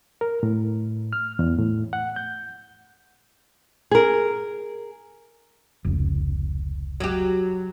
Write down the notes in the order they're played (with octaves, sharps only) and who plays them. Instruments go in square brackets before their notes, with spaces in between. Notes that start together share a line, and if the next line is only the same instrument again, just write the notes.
[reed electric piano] A#4
A2
F6
E2
A2
F#5
G6
[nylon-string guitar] G#4 A#4
[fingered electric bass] F1 C#2
[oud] F#3 G4